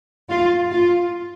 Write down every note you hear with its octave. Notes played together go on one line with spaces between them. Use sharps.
F4
F4